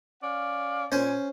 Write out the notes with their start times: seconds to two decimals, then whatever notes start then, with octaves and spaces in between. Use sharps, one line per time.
0.23 C#4 D5 F5
0.92 A#2 C#4 C5 G#5